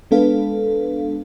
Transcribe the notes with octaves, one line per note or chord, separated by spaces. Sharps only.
G#3 B3 D4 A4 B4 F5